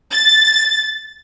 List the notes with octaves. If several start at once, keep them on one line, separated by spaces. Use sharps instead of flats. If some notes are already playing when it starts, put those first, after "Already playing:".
A6